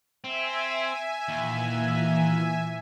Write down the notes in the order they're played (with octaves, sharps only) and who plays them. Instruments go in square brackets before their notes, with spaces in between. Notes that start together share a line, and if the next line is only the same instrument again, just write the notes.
[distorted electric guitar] C4 [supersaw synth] E5 G#5
[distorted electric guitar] D#2 [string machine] A#2 E3